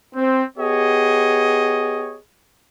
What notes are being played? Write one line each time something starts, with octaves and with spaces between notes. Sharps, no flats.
C4
B3 G4 G#4 C#5 D#5